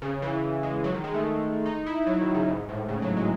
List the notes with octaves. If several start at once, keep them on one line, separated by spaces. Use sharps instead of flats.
C#3
E3
G#3
F#3
D#3
G#3
A3
D#4
E4
F#3
D#3
C#3
G#2
A2
C#3
F#3
G#3